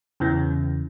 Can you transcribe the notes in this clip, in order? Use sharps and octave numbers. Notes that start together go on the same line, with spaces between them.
E2 C#3 E3